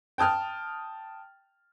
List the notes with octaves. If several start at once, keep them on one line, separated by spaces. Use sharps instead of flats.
G5 A5 D#6 F6